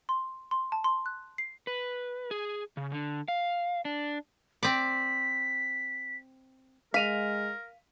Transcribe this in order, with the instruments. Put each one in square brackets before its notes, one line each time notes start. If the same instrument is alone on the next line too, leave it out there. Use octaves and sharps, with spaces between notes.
[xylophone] C6
C6
A5
C6
F#6
C7
[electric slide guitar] B4
G#4
C#3
D3
F5
D4
[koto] C4 D5 [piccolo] B6
[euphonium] G#3 [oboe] A#4 [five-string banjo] F5 [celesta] B6 D#7 F7